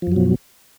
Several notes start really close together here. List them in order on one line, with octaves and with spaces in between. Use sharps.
F3 F#2 F#3 B2